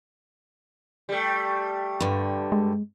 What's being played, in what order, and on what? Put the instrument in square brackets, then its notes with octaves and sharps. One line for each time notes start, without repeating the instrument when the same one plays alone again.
[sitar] G3 A3
[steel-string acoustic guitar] G2 D3
[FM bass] G#3